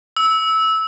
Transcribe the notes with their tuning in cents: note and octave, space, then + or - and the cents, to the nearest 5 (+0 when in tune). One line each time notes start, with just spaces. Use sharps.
E6 -15